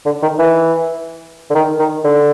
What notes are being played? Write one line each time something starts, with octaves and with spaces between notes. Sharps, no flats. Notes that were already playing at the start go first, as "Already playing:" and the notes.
D3
D#3
E3
D3
D#3
D#3
D3